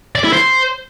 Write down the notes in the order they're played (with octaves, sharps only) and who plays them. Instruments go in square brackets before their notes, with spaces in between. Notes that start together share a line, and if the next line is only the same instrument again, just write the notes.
[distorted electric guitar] D5
E4
C5